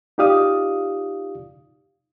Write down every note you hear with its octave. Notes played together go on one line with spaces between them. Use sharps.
D#4 F4 G4 D5 F5 D#6